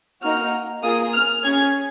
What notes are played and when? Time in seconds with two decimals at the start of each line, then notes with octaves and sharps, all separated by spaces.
0.21 A#3 D#4 F#4 F6
0.83 A#3 F4 G#4 D#6
1.14 F6
1.44 C#4 G#4 G#6